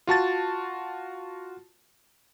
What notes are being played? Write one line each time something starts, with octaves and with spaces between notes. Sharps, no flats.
F4 F#4 A5 A6